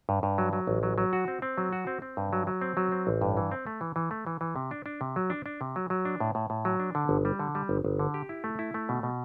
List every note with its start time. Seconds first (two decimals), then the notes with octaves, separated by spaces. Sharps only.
0.09 G2
0.23 G2
0.38 F#3
0.53 F#3
0.67 A1
0.83 F#3
0.98 F#3
1.13 F#4
1.28 C4
1.42 C4
1.58 F#3
1.73 F#4
1.87 C4
2.02 C4
2.17 G2
2.33 F#3
2.47 F#3
2.61 C4
2.77 F#3
2.92 C4
3.07 A1
3.21 G2
3.37 E3
3.51 C4
3.67 A3
3.81 E3
3.96 E3
4.11 A3
4.27 E3
4.41 E3
4.56 C3
4.71 D4
4.86 D4
5.01 C3
5.16 F#3
5.30 D4
5.46 D4
5.61 C3
5.76 F#3
5.90 F#3
6.05 D4
6.20 A2
6.35 A2
6.50 A2
6.65 F#3
6.80 D4
6.95 D3
7.09 G1
7.25 G3
7.39 D3
7.55 G3
7.69 G1
7.85 G1
7.99 D3
8.14 G4
8.29 E4
8.44 A3
8.59 E4
8.74 A3
8.89 B2
9.03 B2